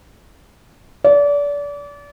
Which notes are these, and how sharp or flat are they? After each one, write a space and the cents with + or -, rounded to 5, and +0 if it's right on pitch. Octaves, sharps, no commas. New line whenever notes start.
D5 -30